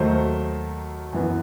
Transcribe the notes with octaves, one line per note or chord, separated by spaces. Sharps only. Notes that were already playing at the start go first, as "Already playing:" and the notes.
Already playing: D#2 D#3 F#3 A3 C5
F#2 E3 B3